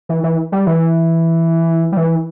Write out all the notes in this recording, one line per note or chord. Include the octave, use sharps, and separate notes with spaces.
E3
E3
G3
E3
G3
E3